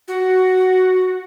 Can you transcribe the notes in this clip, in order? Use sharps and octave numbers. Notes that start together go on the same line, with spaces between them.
F#4